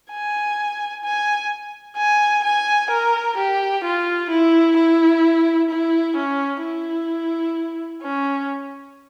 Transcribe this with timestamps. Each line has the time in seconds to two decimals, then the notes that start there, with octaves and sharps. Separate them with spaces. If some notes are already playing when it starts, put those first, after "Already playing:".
0.11 G#5
1.04 G#5
1.97 G#5
2.44 G#5
2.90 A#4
3.37 G4
3.84 F4
4.30 E4
4.77 E4
5.70 E4
6.17 C#4
6.63 E4
8.03 C#4